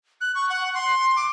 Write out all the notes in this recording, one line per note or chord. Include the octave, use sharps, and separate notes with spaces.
F#6
C#6
F#5
C6
D6